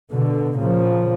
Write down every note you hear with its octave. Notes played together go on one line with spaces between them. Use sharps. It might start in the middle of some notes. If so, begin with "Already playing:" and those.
B2 D3
A#2 C#3 F3